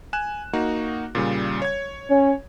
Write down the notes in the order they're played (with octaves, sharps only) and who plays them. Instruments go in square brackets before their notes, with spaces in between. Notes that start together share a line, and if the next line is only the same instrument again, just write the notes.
[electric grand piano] G#5 F#6 E7
A#3 D#4 F#4
A#2 C#3 G3
C#5 G#6
[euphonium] C#4